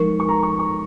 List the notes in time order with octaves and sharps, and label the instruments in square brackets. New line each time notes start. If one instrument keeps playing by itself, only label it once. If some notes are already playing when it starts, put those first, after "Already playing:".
Already playing: [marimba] F3 G#3 D#4 A#4 [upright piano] C#6
[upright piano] C#6
A#5
C#6
C#6